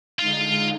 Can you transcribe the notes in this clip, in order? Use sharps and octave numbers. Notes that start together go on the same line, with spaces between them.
D3 G#3 D#4 F4